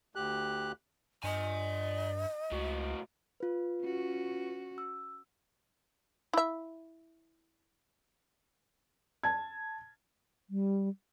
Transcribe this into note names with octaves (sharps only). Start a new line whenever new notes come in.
D2 G4 F#6
G2 D5 D#5 G#5
C#2 A2 F#4
F4 B4
C#4 F#4
E6
E4 E5
A5 G#6
G3